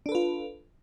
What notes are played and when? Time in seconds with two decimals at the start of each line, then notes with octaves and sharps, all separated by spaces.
0.06 D4
0.09 A4
0.12 B4
0.15 F4